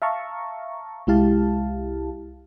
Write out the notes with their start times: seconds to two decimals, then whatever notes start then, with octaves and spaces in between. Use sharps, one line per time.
0.02 E5 F5 A5 A#5 C#6
1.07 C2 G#3 E4 G4 F5 A5